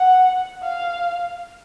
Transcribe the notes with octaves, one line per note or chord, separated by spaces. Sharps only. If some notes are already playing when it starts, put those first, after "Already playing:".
Already playing: F#5
F5